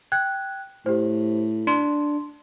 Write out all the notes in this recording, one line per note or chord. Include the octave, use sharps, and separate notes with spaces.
G5 F#6 G#6
A2 G4 C5
D4 C6